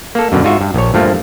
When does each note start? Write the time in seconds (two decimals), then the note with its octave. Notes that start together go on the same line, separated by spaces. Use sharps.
0.15 A#3 A4
0.32 F#2 B2 D3
0.43 G#2 F4 F#4 E5
0.61 G2
0.74 A#1 C#5
0.94 G2 F3 A3 A#3